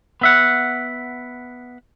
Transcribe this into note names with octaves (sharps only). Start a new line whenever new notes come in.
B3 E5 F#5